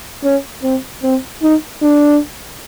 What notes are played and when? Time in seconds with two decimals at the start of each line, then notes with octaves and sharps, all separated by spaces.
0.24 C#4
0.63 C4
1.03 C4
1.43 D#4
1.82 D4